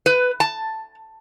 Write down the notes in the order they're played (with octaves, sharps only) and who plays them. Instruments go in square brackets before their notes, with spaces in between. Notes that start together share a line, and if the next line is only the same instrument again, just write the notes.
[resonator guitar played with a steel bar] B4
A5